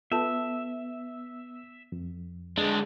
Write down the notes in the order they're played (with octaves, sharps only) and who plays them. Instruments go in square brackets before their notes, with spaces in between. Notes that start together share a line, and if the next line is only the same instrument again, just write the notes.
[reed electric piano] B3 [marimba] F4 A4 A5 [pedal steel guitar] E5
[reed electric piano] F2
[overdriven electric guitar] D3 G#3 [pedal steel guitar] D4